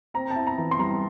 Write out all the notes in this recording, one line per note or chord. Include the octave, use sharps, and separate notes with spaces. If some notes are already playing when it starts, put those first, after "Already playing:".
C4 A#5
A5
E4
A#5
E3
C6
G3 A#5